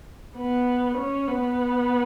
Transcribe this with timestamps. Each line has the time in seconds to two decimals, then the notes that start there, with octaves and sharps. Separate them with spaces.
0.37 B3
0.98 C#4
1.28 B3